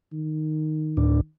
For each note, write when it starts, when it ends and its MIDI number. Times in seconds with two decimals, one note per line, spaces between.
0.13 1.29 51
0.97 1.21 38
0.97 1.21 45
0.97 1.21 62